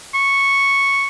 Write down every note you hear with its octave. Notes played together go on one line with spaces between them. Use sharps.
C#6